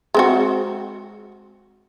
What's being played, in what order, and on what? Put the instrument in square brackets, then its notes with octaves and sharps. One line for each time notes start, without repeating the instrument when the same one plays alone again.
[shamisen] G#3 C4 F#4